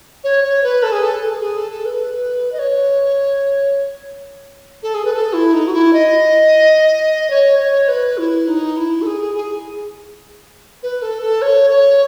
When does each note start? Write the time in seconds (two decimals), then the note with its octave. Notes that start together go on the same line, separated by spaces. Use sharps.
0.23 C#5
0.43 C#5
0.63 B4
0.82 A4
0.92 G#4
1.01 A4
1.41 G#4
1.57 A4
1.71 A4
1.85 B4
2.52 D#5
2.58 C#5
4.82 A4
4.94 G#4
5.04 B4
5.13 A4
5.33 E4
5.53 D#4
5.67 F#4
5.73 E4
5.93 D#5
7.30 C#5
7.59 C#5
7.88 B4
8.17 E4
8.47 D#4
8.76 E4
9.01 A4
9.06 G#4
9.20 G#4
9.35 G#4
10.83 B4
11.02 A4
11.22 A4
11.41 C#5
11.70 C#5